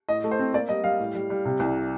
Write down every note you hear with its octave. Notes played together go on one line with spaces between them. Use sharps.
A2 D#5
A3
C5
C4
A#3 D5
G3 D#5
G3 F5
A2
G3
G3
C3
C2